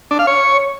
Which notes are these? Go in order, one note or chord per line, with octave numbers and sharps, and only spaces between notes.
D4
F5
C#5